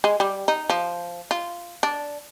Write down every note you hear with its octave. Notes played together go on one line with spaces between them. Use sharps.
G#3
G3
D#4
F3
F4
D4